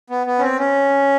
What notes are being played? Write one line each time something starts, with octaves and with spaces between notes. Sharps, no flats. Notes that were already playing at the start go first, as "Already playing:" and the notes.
B3
B3
C#4
C4
C#4